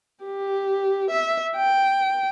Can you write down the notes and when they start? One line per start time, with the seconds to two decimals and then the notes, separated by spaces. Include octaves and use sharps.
0.24 G4
1.10 E5
1.56 G5